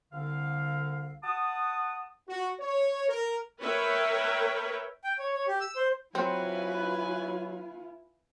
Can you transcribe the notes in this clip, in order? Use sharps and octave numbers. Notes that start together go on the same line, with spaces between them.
C2 D3 F5
F#5 A5 D#6
F#4
C#5
A#4
A#4 B4 C#5 E5 G5
G5
C#5
C#5
G4
E6
C5
F#3 C4 E4 F4 B4 G#5